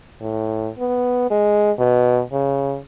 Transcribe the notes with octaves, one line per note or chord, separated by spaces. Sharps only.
A2
B3
G#3
B2
C#3